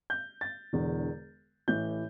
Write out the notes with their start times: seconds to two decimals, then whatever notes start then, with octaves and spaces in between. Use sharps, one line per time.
0.10 G6
0.41 A6
0.73 E1 E2 D3
1.68 A1 A2 E3 G6